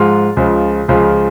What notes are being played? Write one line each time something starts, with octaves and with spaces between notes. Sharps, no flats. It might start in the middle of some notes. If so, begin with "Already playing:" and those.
Already playing: G#2 F3 G#3 F4
C#2 C#3 F3
C#2 C#3 F3